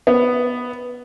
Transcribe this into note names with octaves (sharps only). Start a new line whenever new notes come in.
B3